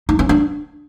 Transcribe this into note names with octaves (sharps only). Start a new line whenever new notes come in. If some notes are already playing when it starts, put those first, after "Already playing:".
D#4
C#4
D4